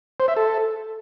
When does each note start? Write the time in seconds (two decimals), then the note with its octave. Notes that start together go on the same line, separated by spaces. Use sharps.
0.20 C5
0.28 E5
0.37 A4